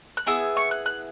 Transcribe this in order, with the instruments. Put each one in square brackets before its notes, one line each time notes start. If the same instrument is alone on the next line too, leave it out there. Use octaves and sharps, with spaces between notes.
[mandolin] F#6
B3 E4 G#4 E6
C#6
F#6
F#6